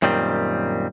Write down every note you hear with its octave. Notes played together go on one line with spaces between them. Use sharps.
F#2 A#2 D#3 G3 C4